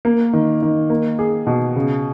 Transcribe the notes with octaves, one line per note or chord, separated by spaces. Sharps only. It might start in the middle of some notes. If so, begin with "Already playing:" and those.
A#3
D#3
D#3
A#3
G#4
B2
C#3